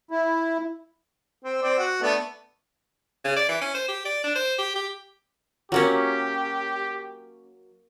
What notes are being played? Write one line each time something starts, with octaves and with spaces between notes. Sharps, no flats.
E4
C4
C4 D5
F#4
A3 B3 D4
C#3
D5
E3
C#4
C5
G4
D5
D4
C5
G4
G4
F#3 A#3 C#4 G4